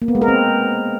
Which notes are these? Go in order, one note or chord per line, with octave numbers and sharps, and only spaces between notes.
A#3
B3
G#3
A#4
C4